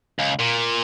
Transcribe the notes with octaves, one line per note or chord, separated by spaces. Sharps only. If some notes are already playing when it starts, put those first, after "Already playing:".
C#2
A#2